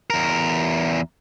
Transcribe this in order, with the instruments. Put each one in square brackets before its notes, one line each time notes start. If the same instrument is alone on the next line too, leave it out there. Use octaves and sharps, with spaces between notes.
[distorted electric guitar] E2 A#4